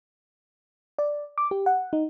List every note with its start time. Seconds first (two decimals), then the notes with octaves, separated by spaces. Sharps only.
0.99 D5
1.38 D6
1.51 G4
1.66 F#5
1.93 D#4